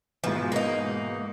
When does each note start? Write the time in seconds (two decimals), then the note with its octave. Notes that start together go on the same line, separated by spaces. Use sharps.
0.24 G#2 B2 E3 F3
0.52 A#3 D#4